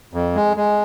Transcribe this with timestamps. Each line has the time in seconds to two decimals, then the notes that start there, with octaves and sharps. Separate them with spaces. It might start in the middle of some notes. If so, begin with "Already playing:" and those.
0.14 F2
0.35 G#3
0.57 G#3